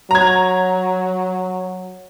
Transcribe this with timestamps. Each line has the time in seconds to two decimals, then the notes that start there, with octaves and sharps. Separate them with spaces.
0.11 F#3 A#5 G#6